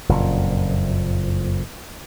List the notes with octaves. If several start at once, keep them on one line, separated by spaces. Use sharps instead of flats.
F#1 F2 A#2